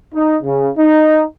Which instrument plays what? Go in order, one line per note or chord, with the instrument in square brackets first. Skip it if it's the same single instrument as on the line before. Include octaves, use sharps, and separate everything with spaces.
[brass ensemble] D#4
C#3
D#4